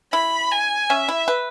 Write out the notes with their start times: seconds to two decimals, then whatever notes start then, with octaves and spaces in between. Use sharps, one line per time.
0.12 E4 B5
0.51 G#5
0.89 C#4 E5
1.08 E4
1.28 B4